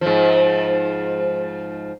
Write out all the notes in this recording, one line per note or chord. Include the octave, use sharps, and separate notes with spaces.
G#2 F3